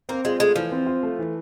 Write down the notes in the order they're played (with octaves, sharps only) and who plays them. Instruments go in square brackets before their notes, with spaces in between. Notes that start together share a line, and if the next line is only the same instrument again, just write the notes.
[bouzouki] A#3 [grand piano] C4
[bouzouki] G#3 [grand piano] F4
[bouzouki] G#3 [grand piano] A3
[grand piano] E3 [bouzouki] F3
[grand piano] C4
F4
A3
E3